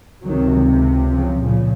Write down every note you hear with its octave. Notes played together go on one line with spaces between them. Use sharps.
C#2 C3 D#3 F#3
C#3 F3
A#2 C#3 F3